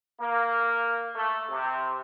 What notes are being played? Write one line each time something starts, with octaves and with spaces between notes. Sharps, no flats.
A#3
A3
C3